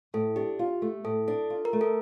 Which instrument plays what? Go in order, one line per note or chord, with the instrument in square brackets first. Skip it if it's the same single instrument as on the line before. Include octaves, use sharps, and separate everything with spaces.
[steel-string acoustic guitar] A2 [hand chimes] A4
[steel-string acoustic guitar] D4 [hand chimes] G4
[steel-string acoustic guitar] F4
A3
[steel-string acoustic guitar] A2 [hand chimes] A4
[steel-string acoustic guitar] D4 [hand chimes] A4
[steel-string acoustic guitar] F4
[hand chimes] A#4
[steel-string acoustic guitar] A3
[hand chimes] A4